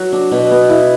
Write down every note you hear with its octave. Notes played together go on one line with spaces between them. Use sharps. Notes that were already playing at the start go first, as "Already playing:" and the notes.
Already playing: F#3
D4
B2
B3
E4